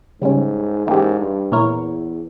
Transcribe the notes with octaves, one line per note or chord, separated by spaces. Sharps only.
G#2 C#3 G3 C#4
G#2 E3 A#3 C#4 G4
G2
E2 A#2 A#3 E4 A#4 C#5